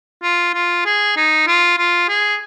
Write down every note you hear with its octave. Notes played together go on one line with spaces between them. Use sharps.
F4
F4
G#4
D#4
F4
F4
G#4